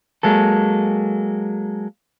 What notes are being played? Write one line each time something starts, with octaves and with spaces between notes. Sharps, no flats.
F#3 G#3 A#3 A4